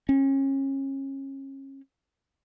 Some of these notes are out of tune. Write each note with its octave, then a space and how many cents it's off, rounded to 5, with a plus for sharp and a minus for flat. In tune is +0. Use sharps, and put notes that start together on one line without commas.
C#4 -30